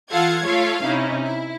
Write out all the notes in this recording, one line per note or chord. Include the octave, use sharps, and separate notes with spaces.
E3 F4 A4 F5 F#5 G#6
A3 F4 A4 C#5 F5
C3 C#4 D#4 E4
E4